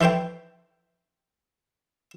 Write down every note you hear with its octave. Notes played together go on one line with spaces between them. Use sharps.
E3 A4 C5 C#5 G5